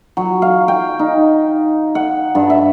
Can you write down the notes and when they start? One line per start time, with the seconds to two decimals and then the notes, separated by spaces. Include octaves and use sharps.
0.17 F#3
0.42 F5
0.68 G5
0.99 D#4
1.95 F#5
2.35 G2
2.50 E5